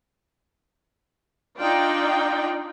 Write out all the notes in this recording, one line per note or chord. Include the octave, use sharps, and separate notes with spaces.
D4 D#4 F4 D5 G5